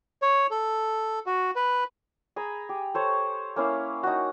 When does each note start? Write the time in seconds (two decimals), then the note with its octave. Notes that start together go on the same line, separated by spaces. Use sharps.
0.22 C#5
0.51 A4
1.26 F#4
1.56 B4
2.36 G#4 G#5 A#5 B5
2.69 G4
2.94 A4 C5 C#5
3.56 A#3 C#4 E4 F5
4.03 D#4 F#4